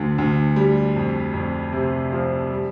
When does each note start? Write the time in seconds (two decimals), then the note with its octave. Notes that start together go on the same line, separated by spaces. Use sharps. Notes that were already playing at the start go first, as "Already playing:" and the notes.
Already playing: D2 D3
0.18 D2
0.56 G3
0.96 F2
1.33 F2
1.73 C3
2.12 F3
2.50 G3